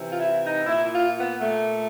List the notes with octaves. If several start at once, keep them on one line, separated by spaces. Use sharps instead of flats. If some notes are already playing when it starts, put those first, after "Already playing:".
Already playing: C3 E3
F4
E4
D#4
A#2 E4
F4
B3
A#2 A3